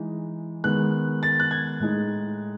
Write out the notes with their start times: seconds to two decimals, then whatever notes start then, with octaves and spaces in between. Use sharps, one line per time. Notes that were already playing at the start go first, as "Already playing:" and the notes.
Already playing: E3 G#3 D#4
0.64 D#3 G#3 B3 F#6
1.23 A6
1.40 F#6
1.51 G#6
1.80 A2 G#3 D#4